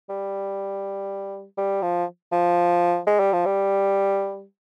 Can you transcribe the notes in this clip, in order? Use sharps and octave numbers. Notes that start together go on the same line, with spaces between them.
G3
G3
F3
F3
G#3
G3
F3
G3